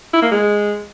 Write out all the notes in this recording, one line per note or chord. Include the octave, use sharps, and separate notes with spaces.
E4
A#3
G#3